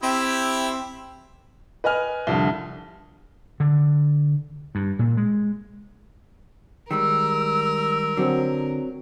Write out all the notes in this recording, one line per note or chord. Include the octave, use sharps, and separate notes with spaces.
C4 E4 G4 E5
B4 D#5 G#5 F6
C2 F2 D3
D3
G2
A#2
G#3
D#3 G3 G#3 A#4 E6
D3 F#3 C4